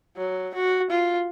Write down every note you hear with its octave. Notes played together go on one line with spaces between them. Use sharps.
F#3
F#4
F4